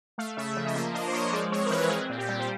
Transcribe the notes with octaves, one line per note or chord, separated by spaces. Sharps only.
A3 F5
C#3 E5
F3
D#5
A#3 E5
D4 D#5
C5
F3 C#5
G#3 D5
C4 C#5
A#4
E3 B4
C4 G#4
A#2
G4
G3
C5